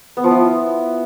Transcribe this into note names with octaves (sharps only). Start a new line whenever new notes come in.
B3
F3
E4